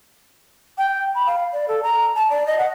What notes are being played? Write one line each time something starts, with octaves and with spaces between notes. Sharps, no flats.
G5
B5
F5
D5
A4
A#5
A5
D5
D#5
F#5